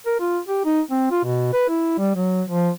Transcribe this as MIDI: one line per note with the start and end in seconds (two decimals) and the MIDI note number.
0.06 0.14 70
0.20 0.39 65
0.48 0.65 67
0.65 0.81 63
0.91 1.10 60
1.11 1.22 65
1.24 1.52 47
1.53 1.66 71
1.69 1.97 64
1.98 2.10 55
2.15 2.43 54
2.49 2.70 53